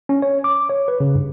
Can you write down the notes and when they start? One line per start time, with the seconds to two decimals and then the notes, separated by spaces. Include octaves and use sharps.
0.09 C#4
0.22 C#5
0.44 D6
0.70 C#5
0.88 B4
1.00 C#3
1.15 G2